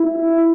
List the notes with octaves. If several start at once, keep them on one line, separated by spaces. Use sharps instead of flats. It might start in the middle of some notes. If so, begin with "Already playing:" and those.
Already playing: E4